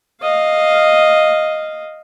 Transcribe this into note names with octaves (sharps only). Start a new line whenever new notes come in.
D#5 F5